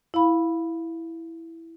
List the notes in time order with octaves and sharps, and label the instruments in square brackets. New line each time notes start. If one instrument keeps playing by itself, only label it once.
[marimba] E4 F5 B5